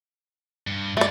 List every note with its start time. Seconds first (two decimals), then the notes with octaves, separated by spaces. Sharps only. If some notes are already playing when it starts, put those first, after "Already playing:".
0.67 G2
0.97 G2 A3 D5